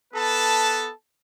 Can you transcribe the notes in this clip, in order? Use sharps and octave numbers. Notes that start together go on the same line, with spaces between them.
B3 A4 B4 A5